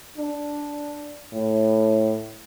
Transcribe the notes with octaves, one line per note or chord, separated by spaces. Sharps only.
D4
A2